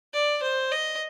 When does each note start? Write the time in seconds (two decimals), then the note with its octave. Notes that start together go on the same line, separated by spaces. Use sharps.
0.13 D5
0.42 C5
0.71 D#5